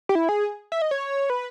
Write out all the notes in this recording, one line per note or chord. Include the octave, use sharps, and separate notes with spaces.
G4
E4
G#4
E5
D#5
C#5
B4